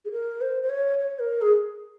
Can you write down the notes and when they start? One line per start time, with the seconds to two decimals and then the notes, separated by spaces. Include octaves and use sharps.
0.05 G#4
0.12 A#4
0.41 C5
0.63 C5
0.69 C#5
0.99 C#5
1.19 A#4
1.42 G#4